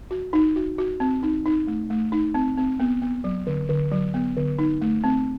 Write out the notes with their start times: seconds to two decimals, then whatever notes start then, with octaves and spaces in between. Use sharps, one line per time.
0.11 F#4
0.33 D#4
0.56 F#4
0.78 F#4
1.00 C4
1.23 D#4
1.45 D#4
1.67 A3
1.90 A3
2.12 D#4
2.34 C4
2.57 C4
2.80 B3
3.02 B3
3.24 F#3
3.47 D3
3.69 D3
3.92 F#3
4.14 B3
4.37 D3
4.59 D#4
4.81 A3
5.04 C4